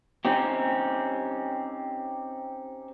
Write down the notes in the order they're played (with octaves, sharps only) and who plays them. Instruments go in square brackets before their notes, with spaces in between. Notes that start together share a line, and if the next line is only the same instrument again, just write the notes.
[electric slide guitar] C4 C#4 D#4 G4